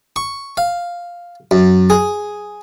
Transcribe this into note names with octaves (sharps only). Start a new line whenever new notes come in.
C#6
F5
F#2
G#4